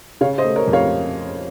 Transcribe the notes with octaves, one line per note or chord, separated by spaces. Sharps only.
C#3 C#5 F5
C5 D#5
A3
A#4 C#5
F2
C#5 F5